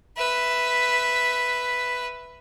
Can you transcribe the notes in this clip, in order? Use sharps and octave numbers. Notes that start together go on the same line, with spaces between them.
B4 E5